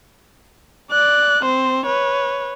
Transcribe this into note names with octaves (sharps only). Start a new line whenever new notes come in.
D5 F#6
C4 C5
B4 C#5